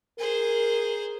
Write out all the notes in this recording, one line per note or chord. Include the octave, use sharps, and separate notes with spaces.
G#4 A#4 C5